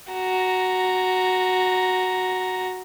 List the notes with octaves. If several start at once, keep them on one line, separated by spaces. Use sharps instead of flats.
F#4 A#5